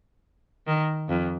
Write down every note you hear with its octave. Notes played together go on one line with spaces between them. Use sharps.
D#3
F2